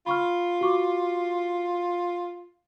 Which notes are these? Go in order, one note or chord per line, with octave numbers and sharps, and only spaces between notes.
F4 B5 C#6 F6
F#4 C#6 D6